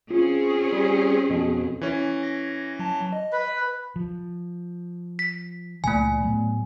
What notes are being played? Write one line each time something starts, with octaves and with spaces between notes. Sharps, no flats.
C4 C#4 F4 G#4
G3
F2 B2
E3 C#4
A#6
F#3 A5
D#5
B4
F3
B6
C#2 A#2 E3 A3 G#5
A2 F#3 B3